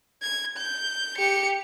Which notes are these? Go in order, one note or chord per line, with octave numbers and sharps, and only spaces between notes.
G#6
G6
G4 C#7